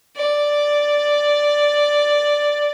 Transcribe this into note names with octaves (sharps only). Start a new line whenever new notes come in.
D5